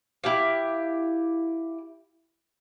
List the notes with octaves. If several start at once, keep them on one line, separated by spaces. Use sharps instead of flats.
E4 G4 F5